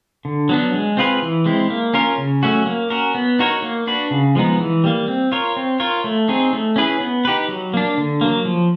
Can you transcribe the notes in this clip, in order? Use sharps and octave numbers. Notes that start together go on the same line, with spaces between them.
D3
F#3 B3 D4
G#3
C4 F4 G#4 B4
E3
G#3 C4 E4
A#3
C#4 F4 A#4
C#3
F#3 A3 C#4 F#4
A#3
C#4 F#4 A#4
B3
D#4 F#4 A#4 C#5
A#3
D4 F#4 B4
C#3
F3 G#3 B3 D#4
E3
G3 A#3
C4
F4 A#4 C#5
C4
F4 A#4 C#5
A3
C4 D#4 G#4 C#5
A3
C#4 E4 G#4 B4
B3
D#4 G4 B4
F#3
A#3 D4
D3
F#3 A#3
F3